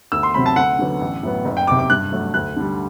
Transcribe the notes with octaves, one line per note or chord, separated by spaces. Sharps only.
D2 E6
C6
C3 F#3 C4 B5
A5
D2 F#5
D3 F#3 B3
A1
A2 F#3 B3
F#1
G5
E2 C3 D6
D6
G2 F#6
F#3 A3
D2 F#6
D3 G3